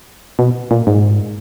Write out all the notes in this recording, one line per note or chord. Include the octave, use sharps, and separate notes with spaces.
B2
A#2
G#2